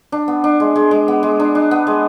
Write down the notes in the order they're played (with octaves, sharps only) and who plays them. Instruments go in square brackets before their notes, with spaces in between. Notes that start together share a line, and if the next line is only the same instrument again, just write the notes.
[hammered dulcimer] D4
B3
D4
G#3
G#3
G#3
B3
G#3
D4
D4
B3
G#3